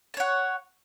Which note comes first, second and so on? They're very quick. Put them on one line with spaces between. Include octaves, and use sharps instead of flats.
A5 C#5 F#5